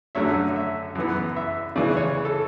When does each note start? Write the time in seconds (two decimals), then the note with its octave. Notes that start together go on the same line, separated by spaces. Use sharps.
0.15 F#2 D3 F#3 A3 C#4 E5
0.56 E5
0.95 F#2 E3 B3
1.36 E5
1.76 C#3 E3 G#3 D5
1.97 C#5
2.25 A4